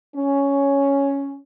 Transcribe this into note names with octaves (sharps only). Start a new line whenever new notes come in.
C#4